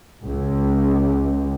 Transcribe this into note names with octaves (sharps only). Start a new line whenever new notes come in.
C#2